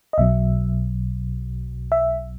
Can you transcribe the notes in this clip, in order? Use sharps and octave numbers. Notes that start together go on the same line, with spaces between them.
D#5
B1 B2 F#3 E5
E5